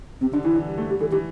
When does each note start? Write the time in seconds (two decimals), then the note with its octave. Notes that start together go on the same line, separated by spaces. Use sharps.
0.21 C3 C4
0.33 D3 D4
0.44 E3 E4
0.56 D3
0.67 G3
0.78 A3
0.90 G3 G4
1.00 E3 A4
1.12 E3 G4